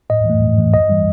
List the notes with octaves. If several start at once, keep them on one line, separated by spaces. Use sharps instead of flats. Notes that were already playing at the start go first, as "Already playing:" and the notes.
A2 D#5
E3 A3
A2
E3 A3
G2 D#5
E3 G3